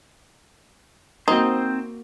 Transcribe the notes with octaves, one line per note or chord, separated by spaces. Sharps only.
A#3 C4 D#4 F#4 C5